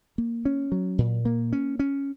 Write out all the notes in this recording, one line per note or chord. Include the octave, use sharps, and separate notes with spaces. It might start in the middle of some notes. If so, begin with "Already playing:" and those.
A#3
C#4
F#3
A#2
A#3
C#4
C#4